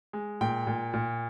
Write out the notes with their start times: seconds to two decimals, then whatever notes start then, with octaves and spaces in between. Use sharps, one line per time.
0.13 G#3
0.41 A#2 G5
0.67 A#2
0.94 A#2